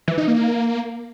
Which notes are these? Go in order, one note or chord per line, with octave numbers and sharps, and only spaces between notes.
E3
D#4
A#3